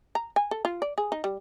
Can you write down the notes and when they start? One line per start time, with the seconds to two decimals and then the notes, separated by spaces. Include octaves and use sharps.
0.15 A#5
0.36 G#5
0.51 A4
0.65 F4
0.82 D5
0.98 G#4
1.12 D#4
1.24 G3